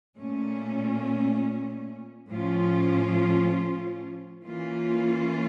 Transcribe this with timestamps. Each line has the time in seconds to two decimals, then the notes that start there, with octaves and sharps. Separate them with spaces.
0.16 A#2 A3 C#4
2.31 A2 F3 C#4 F4
4.44 E3 A#3 C#4 F4